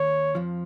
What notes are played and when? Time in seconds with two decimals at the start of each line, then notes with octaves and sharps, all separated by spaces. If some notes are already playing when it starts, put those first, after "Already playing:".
Already playing: D#2 D#3 C#5
0.35 F2 F3